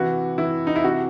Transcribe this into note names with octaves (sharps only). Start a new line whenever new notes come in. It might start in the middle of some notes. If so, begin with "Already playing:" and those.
Already playing: C3 E3 F#4
E3 E4
D#4
E4
C3 F#4